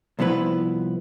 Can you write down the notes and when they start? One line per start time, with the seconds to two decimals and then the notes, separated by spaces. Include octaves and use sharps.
0.19 C2 F3 B3 E4 B4